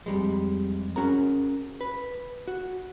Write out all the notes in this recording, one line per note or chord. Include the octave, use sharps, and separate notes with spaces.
F2 G3 G#3
C#4 F#4 G#4 A#4 A#5
B4
F#4